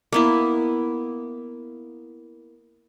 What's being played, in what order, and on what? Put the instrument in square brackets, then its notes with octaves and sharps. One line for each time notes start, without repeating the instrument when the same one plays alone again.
[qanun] A#3 B3 E4